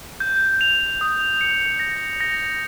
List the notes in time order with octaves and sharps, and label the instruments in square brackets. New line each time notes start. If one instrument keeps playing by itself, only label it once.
[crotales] G6
F7
D#6
C#7
A#6
A#6